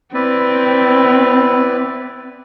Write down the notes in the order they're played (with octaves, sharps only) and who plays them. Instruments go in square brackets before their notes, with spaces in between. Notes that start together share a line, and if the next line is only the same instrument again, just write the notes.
[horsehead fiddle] C4 [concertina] E4 B4 D5